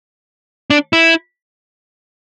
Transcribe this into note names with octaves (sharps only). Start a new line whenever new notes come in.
D4
E4